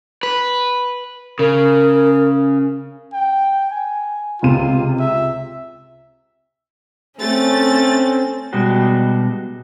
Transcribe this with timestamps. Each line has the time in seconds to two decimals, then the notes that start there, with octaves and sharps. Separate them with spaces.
0.23 B4
1.39 C#3 A#4
3.13 G5
3.71 G#5
4.42 C#2 C3 F4 D#7
4.99 E5
7.19 A3 C4 C#4 A6
8.53 B2 G3 G#3 F#4